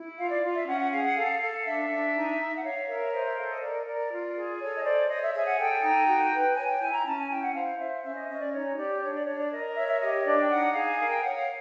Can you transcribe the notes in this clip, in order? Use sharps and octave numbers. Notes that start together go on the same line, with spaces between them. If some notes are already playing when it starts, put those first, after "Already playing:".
Already playing: E4
F4 F5
D5
F4
E5
C#4 F#5
F#5
G#4 F5
F#5
A4 F5
A4 F5
D4 E5
D4
D#4
D#4
F#5
C#5 F5
A#4 E5
C5 D#5
E5
A4 F5
D#5
A#4 D5
A#4 D5
F4
G#4
A4 C#5
D#5
C5 D5
C#5 D#5
E5
G#4 E5
F#5
A4 G5
D#4
F#4
B4
C#5 G#5
G5
E4 G#5
A#5
C#4 A5
G#5
E4 G5
F#5
C5 F5
C5 E5
C#4 E5
D#5
C#4 D#5
D5
D#4 C#5
G4 D5
D4 C#5
D5
D4 C#5
D5
A#4 D#5
C#5 E5
E5
G4 D#5
D4 D5
G5
D#4 F#5
G#4 F5
A#4 F5
G5
C#5 F#5
F5